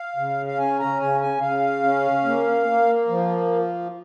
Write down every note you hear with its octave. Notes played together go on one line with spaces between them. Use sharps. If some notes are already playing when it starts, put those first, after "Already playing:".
Already playing: F5
C#3
F5
C#4 G#5
A#5
C#3 G#5
G#5
C#3 F5
C#4
A#3
A#3
F3